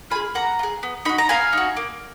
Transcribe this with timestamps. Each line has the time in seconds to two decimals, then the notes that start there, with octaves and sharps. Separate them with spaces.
0.10 F4 G#5 B5
0.15 G#4
0.35 A#3 F#5 A#5
0.59 F4
0.63 G#4
0.83 B3
1.05 D#4 F#4 B5
1.18 A#5
1.29 B3 F5 G#5
1.53 D#4 F#4
1.77 A#3